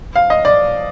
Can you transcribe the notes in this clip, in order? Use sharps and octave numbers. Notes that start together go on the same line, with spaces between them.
F5
D#5
D5